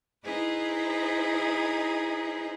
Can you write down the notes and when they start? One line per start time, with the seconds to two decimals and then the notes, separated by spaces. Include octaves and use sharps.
0.24 D#4 E4 G#4 B4 C5